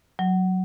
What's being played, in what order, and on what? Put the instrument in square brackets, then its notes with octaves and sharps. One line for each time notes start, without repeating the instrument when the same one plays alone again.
[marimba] F#3